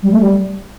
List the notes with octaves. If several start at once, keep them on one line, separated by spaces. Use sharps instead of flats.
G3
A3
G3